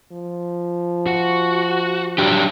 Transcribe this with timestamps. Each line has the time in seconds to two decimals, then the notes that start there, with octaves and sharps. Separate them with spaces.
0.12 F3
1.06 F#4
2.18 F#3 D4 G4